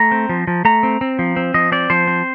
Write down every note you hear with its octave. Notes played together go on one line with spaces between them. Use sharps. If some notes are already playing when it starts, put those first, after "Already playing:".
Already playing: A3 A#5
C4
F3
F3
A3 A#5
C4
C4
F3
C4
F3 D#5
C4 D5
F3 C5
C4